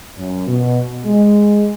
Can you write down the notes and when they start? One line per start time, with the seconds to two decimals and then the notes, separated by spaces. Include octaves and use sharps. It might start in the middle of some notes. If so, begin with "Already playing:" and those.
0.17 F#2
0.47 B2
1.05 G#3